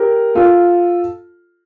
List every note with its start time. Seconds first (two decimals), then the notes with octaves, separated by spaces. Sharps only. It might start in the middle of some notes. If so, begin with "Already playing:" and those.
Already playing: G4 A#4
0.35 F4 A4